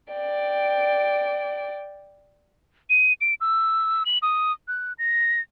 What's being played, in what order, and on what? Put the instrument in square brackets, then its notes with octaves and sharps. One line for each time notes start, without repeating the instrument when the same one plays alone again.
[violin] D5 G5
[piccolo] D#7
D7
E6
F#7
D#6
F#6
A#6